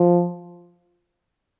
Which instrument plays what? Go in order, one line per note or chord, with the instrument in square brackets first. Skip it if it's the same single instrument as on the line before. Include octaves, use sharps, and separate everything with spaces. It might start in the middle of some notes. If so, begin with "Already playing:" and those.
Already playing: [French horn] F3